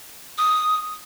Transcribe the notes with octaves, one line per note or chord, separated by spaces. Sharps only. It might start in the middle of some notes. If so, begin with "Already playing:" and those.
D#6